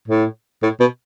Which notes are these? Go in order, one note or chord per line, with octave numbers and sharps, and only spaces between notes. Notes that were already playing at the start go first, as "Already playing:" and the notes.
A2
A2
B2